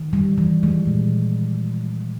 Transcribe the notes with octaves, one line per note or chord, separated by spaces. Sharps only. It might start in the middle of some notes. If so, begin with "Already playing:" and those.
Already playing: D#3
G3
E3
G#3
A#2